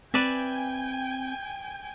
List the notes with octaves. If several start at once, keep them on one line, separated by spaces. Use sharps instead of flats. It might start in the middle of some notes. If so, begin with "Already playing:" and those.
C4 B4 D5 E5 G5 G#5